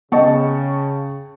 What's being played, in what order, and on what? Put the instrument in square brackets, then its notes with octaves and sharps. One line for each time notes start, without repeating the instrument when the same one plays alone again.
[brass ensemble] C#3 [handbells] B3 D#5 [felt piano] G5 A5 C#6